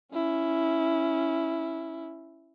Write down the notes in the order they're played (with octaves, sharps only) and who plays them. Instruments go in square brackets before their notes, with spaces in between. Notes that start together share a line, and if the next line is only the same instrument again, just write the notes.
[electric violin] C#4 E4